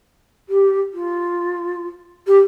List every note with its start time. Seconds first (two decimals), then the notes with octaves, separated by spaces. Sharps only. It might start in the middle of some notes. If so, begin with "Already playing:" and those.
0.49 G4
0.93 F4
2.27 G4